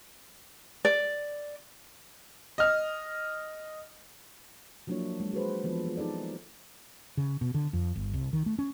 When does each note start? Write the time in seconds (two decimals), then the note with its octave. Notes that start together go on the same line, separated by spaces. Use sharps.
0.85 D5
2.58 D#5 F6
4.87 F3 F#3 A#3 D4 E4 C#5
5.20 G#3
5.33 F#4 G#4 B4 C5
5.64 E3 F3 B3 A4
5.84 F3 F4
5.97 D#4 G#4 A4 D5
7.17 C#3
7.41 B2
7.54 D3
7.73 F2
7.96 G1
8.14 C2
8.33 D#3
8.46 A3
8.59 C#4